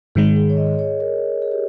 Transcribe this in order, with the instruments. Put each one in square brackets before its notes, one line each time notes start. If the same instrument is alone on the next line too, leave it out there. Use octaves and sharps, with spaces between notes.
[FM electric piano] G#2 D#3 G#3 [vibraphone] G#4
[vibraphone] G#4
C#5
D#5
C#5
A#4
G#4
G4